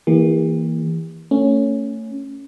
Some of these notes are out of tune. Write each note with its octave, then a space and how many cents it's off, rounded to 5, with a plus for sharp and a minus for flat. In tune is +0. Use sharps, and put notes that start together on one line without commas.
E3 -15 A#3 +0 G4 +40
A3 +30 C#4 +0